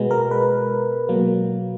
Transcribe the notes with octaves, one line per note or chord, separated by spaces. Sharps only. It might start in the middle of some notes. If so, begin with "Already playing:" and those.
Already playing: B2 G#3 B3
A#4
B4
B2 F#3 A#3